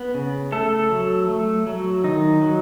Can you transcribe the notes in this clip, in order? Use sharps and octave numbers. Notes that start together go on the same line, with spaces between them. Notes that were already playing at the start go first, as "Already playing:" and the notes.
Already playing: B3
C#3
A3 A4
F#3
A3
F#3
D#3 D#4
F#3